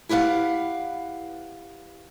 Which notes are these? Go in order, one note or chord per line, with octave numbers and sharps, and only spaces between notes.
E4 G4 B4 F5 F#5